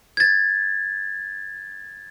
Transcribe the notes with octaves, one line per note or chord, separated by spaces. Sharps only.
G#6 A6